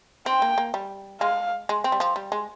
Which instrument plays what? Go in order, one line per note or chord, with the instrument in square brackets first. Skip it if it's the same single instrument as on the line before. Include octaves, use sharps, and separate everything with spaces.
[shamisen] C4 [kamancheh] G5
[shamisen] A#3
A#3
G3
[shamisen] G#3 [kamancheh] F5
[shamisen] G#3
C4
G3
F3
G3
G#3